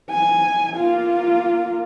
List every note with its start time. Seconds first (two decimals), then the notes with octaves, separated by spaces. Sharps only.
0.11 G#5
0.76 A#3 F4